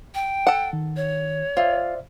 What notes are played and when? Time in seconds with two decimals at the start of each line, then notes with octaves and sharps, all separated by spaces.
0.15 G5
0.47 A4 F#5
0.73 D#3
0.96 C#5
1.57 F4 C5 D5 E5